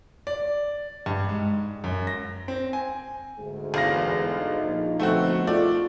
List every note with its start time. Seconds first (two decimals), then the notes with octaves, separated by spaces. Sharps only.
0.27 D5
1.06 G2
1.29 G#2
1.84 F#2
2.07 A#6
2.48 C4
2.73 G#5
3.39 D2 G#2 G#4
3.74 G1 E2 F5 A#6
4.25 D#4
4.64 A#1
4.99 D2 B2 F3 A3 C4 F#4
5.47 A3 F4 G#4 D5